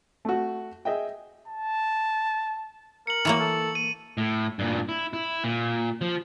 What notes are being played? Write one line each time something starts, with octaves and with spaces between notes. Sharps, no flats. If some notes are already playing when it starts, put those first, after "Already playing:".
A3 F#4
G#4 D#5 E5 G5
A5
A#4 C#7 F#7
E3 F#3 A#3
A4
D#7
A2
G2 A#2
E4
E4
A#2
F3